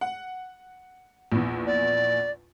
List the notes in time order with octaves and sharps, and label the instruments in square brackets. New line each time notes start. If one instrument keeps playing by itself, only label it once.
[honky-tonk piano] F#5
A#1 E2
[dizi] D5